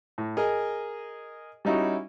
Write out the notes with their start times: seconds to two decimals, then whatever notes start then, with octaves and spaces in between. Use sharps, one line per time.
0.18 A2
0.37 G#4 A#4 D#5 G#5
1.65 G3 C#4 D#4 E4 F#4